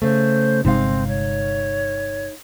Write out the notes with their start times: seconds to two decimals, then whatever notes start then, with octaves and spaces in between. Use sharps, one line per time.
0.02 C#3 A3 C5
0.65 G1 C3 G#3 C4 D#4 F5
1.08 C#5